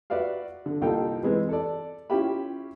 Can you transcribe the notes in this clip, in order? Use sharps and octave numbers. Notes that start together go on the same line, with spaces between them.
F#4 B4 D5 E5 F5
D3
C2 A#3 D#4 F4 A4 G5
E3 G#3 C4 B4
A4 D5
C#4 E4 F4 G4 E5 B5